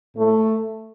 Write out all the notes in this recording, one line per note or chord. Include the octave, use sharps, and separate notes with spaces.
A2 A3